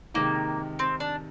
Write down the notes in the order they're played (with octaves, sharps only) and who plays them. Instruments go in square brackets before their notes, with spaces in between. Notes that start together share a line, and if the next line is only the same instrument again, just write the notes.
[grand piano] C3 D#3 G#3 D#4 [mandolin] A#3
[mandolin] C4
D4